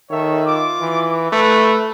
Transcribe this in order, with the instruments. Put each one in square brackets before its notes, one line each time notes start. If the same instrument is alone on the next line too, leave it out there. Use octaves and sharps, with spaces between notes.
[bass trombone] D#3 [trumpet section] A4 C#5 E5
[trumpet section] F4 D6
[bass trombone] E3
[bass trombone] A3 [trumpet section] B4